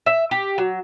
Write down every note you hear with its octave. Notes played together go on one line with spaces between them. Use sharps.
E5
G4
F#3